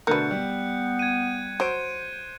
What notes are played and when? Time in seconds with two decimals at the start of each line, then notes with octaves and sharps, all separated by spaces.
0.07 B2 D3 A3 A#4 B4 F#6 G6 C#7
0.31 G3 B3
0.99 G#6 D#7
1.60 F#3 C5 D7